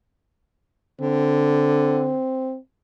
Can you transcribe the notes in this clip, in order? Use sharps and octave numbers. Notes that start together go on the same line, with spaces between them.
D3 C4